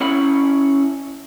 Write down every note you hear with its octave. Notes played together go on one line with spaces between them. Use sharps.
C#4 E4 C#5 F#5 B5